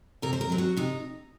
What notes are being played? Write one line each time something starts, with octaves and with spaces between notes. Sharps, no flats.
C3 A#4
C5
A#4
F#3 C4
F#4
C3 D#4